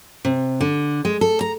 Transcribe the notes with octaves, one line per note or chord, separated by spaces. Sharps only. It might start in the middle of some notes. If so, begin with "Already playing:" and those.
C3
D3
G#3
A4
A#5